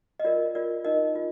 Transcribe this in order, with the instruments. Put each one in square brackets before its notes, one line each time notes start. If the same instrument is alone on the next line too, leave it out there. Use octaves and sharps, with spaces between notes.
[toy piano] D#5
F4 A#4 D5
F4 A#4 D5
D#4 A#4 D#5
F4